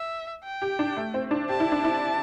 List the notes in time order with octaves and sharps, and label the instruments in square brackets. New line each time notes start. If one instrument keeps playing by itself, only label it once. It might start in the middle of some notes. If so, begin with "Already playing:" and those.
Already playing: [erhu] E5
G5
[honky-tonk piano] G4
D4
A3
C4
D4
[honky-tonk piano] G4 [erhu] A5
[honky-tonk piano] E4
D4
E4